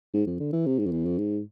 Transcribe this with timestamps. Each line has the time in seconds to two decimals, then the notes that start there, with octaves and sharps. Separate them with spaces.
0.14 G#2
0.26 F2
0.40 D3
0.53 E3
0.66 C3
0.79 G#2
0.86 F2
0.92 E2
1.06 F2
1.18 G#2